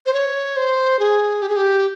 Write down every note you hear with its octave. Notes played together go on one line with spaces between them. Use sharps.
C5
C#5
C5
G#4
G4
G#4
G4